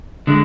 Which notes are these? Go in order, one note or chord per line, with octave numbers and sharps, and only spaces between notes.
D3 G#3